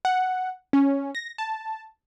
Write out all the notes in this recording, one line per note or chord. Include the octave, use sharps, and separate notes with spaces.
F#5
C#4
A#6
A5